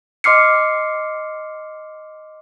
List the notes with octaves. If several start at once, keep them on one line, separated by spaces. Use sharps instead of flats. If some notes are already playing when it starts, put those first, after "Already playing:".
D#5 C6 D6 F6 C7 C#7